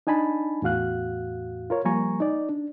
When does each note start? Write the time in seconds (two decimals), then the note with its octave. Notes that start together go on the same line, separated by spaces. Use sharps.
0.07 D4 D#4 G#5 A5 B5
0.62 E2 A2 F#4 F5 F#6
1.70 F4 A#4 C#5
1.85 F3 G3 A#3 G#5 A#5 C#6
2.20 D#4 D5
2.49 D4